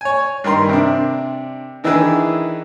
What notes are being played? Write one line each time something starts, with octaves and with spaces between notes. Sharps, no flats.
C#5 G#5
G2 D#3 A#4 C6
C3 D4
D#3 E3 D4 E4 G#4 B4